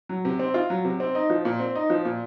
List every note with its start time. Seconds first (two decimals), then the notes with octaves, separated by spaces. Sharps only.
0.09 F#3
0.25 C3
0.39 C4
0.54 F4
0.70 F#3
0.85 C3
1.00 C4
1.15 D#4
1.30 F3
1.45 A#2
1.60 C4
1.75 D#4
1.90 F3
2.05 A#2